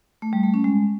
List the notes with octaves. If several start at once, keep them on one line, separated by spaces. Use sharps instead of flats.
A3
G3
A3
C#4
G#3